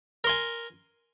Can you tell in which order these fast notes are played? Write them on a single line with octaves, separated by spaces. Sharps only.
A#4 C6 G#5